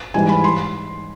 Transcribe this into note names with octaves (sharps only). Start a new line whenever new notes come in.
G#2 E3 G3 G#5
B5
C6